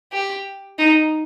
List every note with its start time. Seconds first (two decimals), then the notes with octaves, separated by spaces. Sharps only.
0.12 G4
0.79 D#4